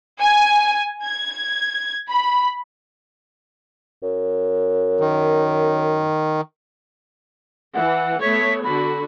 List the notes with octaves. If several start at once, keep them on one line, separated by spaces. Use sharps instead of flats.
G#5
G#6
B5
F#2
D#3
E3 F#5
A3 B3 C#5 B6
D3 F#4 B5